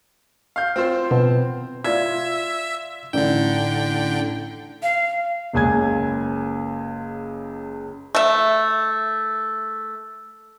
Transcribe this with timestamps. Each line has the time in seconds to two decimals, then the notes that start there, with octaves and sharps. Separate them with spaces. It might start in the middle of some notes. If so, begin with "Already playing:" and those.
0.56 F5 G6
0.76 C4 F4 C5
1.11 B2
1.84 F4 D5 E5 G#6
3.13 A1 D3 D#4 D5 G5
4.83 F5
5.53 F#1 C#2 G#5 G#6
8.15 A3 E5